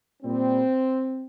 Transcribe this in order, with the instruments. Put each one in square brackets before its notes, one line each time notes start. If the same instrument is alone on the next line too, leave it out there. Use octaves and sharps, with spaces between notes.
[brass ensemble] A#2 G3 C4